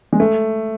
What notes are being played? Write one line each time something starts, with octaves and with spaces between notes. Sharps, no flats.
G#3
A3